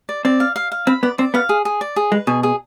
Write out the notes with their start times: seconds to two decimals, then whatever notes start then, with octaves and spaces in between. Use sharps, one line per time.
0.09 D5
0.25 C4 D5
0.40 F5
0.56 F5
0.72 F5
0.87 C4 B5
1.03 B3 D5
1.18 C4 D5
1.34 B3 F5
1.49 G#4
1.65 G#4
1.81 D5
1.96 G#4
2.12 G#3 B4
2.27 B2 G#4
2.43 G#4